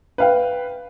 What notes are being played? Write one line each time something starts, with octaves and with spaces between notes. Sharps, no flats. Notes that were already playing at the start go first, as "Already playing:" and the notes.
B4 F5 G5